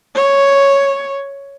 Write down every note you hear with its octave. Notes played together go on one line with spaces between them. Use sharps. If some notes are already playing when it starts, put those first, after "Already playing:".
C#5